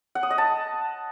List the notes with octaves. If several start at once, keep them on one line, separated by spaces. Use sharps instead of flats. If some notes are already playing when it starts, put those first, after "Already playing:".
F#5
D#6
D#5
A5